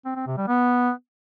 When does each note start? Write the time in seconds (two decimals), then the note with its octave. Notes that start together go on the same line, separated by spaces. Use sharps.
0.05 C4
0.16 C4
0.27 C3
0.37 G3
0.48 B3